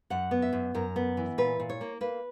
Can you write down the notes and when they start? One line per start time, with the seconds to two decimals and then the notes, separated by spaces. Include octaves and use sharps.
0.10 F#2 F#5
0.31 B3
0.42 E5
0.53 F#2
0.74 F#2 A#4
0.96 B3
1.17 E3
1.38 A#2 B4
1.60 A#2
1.70 C#5
1.81 A#3
2.01 A#3 B4